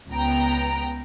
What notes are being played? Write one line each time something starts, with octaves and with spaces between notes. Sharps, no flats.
C#2 B3 G5 A#5